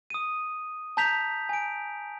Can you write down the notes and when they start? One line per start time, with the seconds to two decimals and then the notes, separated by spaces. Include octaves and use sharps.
0.10 D#6 D#7
0.97 A5 A#5 G6 B6 F7
1.49 G#5 D7